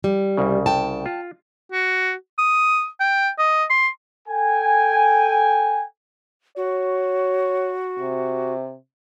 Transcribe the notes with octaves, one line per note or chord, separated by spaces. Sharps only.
G3
C2 C#3
G5 A5
F4
F#4
D#6
G5
D#5
C6
A4 G5 G#5
F#4 C#5
C3